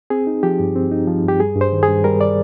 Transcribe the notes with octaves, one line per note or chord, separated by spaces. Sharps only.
C4 G#4
D#4
F3 G4
G2
C4
D#4
F3
G2 G4
G3 G#4
G2
C5
D#3
G#4
G2
G3 A#4
D5